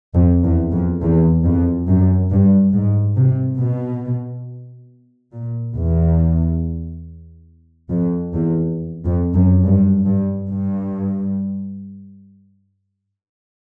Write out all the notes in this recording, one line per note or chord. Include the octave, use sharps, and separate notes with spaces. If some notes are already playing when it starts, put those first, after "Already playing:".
F2
E2
F2
E2
F2
F#2
G2
G#2
C3
B2
A#2
E2
F2
E2
F2
F#2
G2
G2
G2